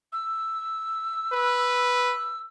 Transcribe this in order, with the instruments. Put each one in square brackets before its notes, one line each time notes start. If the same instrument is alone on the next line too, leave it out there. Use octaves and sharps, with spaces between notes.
[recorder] E6
[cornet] B4